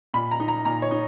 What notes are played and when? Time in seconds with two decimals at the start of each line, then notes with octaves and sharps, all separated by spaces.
0.14 A#2 B5
0.31 A#5
0.40 D#4
0.48 A#5
0.65 A#2 A#5
0.82 C#5
0.91 D#4